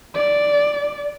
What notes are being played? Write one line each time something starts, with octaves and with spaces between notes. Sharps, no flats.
D5